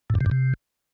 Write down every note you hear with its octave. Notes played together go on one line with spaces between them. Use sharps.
A2
G2
C3
G2
C3